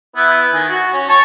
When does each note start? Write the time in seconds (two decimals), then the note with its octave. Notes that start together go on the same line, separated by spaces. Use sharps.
0.16 B3 E4 B4
0.53 D#3 G#5
0.69 F#4
0.94 C#4
1.09 C#5 A5 C#6